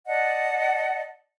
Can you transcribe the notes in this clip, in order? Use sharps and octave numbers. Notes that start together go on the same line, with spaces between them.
D5 D#5 F#5 A5